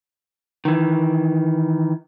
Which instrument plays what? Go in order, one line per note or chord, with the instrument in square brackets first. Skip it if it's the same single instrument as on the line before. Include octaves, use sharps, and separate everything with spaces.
[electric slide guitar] D#3 E3